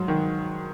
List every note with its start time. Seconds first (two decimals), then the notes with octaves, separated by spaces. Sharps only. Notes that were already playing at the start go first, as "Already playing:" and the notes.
Already playing: G#2 F#3
0.08 D#3